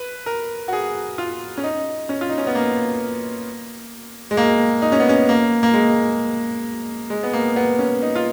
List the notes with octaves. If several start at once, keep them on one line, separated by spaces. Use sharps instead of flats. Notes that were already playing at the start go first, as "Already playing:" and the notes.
Already playing: B4
A#4
F#4
G#4
F4
C#4
D#4
C#4
F4
D#4
C#4
B3
A#3
G#3
A#3
D#4
C#4
B3
C#4
A#3
A#3
G#3
G#3
B3
A#3
B3
C#4
D#4
F4